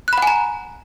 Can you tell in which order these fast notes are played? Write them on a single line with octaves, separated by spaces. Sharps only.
F#6 B5 F#5 G#5 A#5